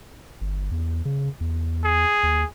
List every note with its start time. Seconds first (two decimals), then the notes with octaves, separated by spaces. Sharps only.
0.41 G1
0.71 E2
1.05 C#3
1.41 E2
1.84 G#4
2.23 D#2